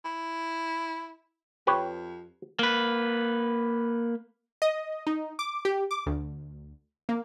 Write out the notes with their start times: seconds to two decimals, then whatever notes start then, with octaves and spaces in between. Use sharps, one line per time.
0.05 E4
1.67 F2 G4 B4 C#5
2.59 A#3 B4
4.62 D#5
5.07 D#4
5.39 D6
5.65 G4
5.91 D6
6.06 D2
7.09 A#3